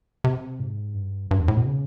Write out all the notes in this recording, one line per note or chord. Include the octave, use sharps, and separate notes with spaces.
C3
G#2
G2
G2
E2
A2
B2
C#3